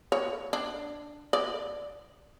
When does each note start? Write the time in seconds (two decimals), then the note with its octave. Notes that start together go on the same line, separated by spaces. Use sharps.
0.12 C#5
0.53 D4
1.33 D5